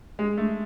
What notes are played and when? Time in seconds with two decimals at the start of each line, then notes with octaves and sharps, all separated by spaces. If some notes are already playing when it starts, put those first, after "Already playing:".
0.19 G#3
0.37 A3